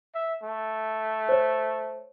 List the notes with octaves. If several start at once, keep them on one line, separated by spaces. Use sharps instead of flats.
E5
A3
C5 C#5